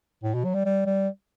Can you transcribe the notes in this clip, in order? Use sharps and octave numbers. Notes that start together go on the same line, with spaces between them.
A2
B2
F#3
G3
G3
G3